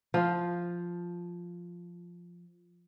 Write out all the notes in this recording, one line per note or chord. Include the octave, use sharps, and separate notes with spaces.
F3 F4